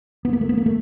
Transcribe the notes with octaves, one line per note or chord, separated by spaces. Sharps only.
B3
A#3
A3
B3
A#3
A3